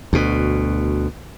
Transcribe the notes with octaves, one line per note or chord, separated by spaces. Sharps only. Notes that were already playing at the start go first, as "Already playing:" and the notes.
D2 B2